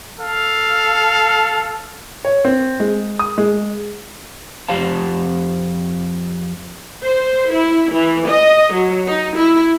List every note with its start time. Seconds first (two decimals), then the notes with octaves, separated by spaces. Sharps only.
0.20 A4 F5
2.25 C#5
2.45 C4
2.80 G#3
3.19 D#6
3.38 G#3
4.68 F2 G4 C5 F5 A5
7.04 C5
7.52 E4
7.94 E3
8.28 D#5
8.73 F#3
9.07 D#4
9.37 E4